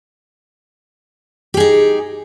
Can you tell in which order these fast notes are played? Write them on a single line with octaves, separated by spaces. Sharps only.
G4 G#4 D#4